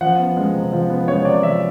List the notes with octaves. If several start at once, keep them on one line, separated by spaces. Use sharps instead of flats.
F3 F#5
B3
G#3
C3
F3
B3
G#3 C#5
C3 D5
F3 E5